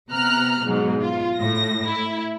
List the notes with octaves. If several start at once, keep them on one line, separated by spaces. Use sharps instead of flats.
C3 B3 A#5 F6 F#6
G#2 B2 F#3
F4
A2 A#6
E4